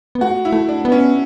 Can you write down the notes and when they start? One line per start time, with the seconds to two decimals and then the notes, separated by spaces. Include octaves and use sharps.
0.15 B3
0.21 A3 F#4
0.45 E4
0.52 A3
0.69 D4
0.85 B3
0.92 C#4